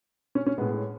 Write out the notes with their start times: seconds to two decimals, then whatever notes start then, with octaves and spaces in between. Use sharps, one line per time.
0.35 C#4
0.46 C#4
0.58 A2 G#3 B3